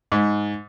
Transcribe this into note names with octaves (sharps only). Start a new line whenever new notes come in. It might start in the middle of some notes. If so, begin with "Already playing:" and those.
G#2